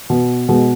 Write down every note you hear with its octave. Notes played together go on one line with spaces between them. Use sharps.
B2
B2 G#3